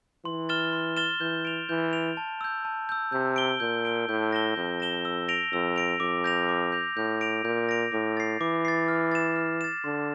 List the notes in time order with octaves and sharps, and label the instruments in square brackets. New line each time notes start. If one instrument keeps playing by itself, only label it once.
[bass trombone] E3 [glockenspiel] C6
[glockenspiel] F6 A6 E7 G7
C6
F6 A6 E7 G7
[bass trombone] E3 [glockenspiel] G6
[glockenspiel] D7 F7
[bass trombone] E3 [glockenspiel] G6
[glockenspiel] D7 F7
A5
E6 G6
A5
E6 G6
[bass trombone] C3 [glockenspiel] G6
[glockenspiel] D7 G7
[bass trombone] A#2 [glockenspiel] G6
[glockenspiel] D7 G7
[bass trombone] A2 [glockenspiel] G6
[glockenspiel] A#6 E7 G7
[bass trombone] F2 [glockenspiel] G6
[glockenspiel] A#6 E7 G7
E6
A#6 D7 F7
[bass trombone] F2 [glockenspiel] E6
[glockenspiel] A#6 D7 F7
[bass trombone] F2 [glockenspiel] D6
[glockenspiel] G6 A#6 F7
D6
G6 A#6 F7
[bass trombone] A2 [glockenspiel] G6
[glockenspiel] A#6 D7 F7
[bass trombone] A#2 [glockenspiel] G6
[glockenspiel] A#6 D7 F7
[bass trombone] A2 [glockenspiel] D6
[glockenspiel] A6 C7
[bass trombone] E3 [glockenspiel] D6
[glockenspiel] A6 C7
F6
A6 E7
F6
A6 E7
[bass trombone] D3 [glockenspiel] C6